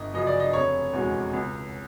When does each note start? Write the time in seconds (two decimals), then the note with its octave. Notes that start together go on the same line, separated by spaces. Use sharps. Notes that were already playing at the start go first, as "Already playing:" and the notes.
Already playing: G1 D#5
0.14 F#2 C#3 F3 D#5
0.27 D5
0.40 D#5
0.53 F1 C#5
0.93 E2 B2 G#3
1.34 C#2